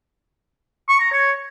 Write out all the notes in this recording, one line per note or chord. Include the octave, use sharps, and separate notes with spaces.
C#6
A#5
C#5